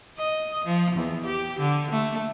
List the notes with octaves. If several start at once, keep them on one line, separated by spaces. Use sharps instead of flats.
D#5
F3
E2
G4
D3
A3